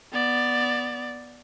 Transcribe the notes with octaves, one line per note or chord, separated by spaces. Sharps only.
B3 D5